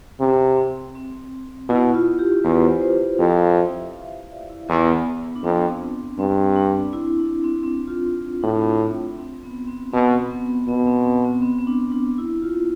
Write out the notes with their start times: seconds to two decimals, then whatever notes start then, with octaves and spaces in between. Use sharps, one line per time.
0.20 C3
0.57 C4
0.95 C4
1.69 B2 E4
1.94 F4
2.19 G4
2.44 E2 B4
2.64 C5
2.81 C5
3.19 F2 F5
3.38 F5
3.57 E5
3.76 E5
3.93 F5
4.32 D5
4.50 E4
4.69 E2 B3
5.36 D4
5.44 F2 C4
6.18 G2 C4
6.56 D4
6.93 E4
7.19 D4
7.44 C4
7.63 C4
7.68 D4
7.88 F4
8.05 C4
8.43 A2 D4
9.18 C4
9.43 B3
9.67 C4
9.92 B2 C4
10.31 B3
10.67 B2 B3
10.87 C4
11.05 C4
11.24 B3
11.42 C4
11.59 C4
11.67 D4
11.92 D4
12.18 E4
12.42 F4